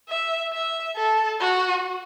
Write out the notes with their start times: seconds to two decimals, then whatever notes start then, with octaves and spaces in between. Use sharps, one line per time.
0.09 E5
0.53 E5
0.96 A4
1.40 F#4